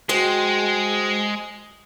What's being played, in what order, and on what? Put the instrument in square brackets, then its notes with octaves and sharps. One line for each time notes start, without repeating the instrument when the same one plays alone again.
[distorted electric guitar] G#3 [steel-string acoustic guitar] F#4 C5 G5